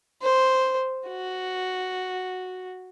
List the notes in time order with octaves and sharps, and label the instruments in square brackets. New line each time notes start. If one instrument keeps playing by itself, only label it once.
[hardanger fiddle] C5
F#4